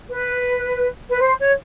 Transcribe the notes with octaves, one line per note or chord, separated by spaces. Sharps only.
B4
B4
C5
C#5